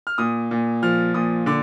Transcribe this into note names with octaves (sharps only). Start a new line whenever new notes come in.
F6
A#2 D#6
A#2
F3 F6
A#2 D#6
D3 D6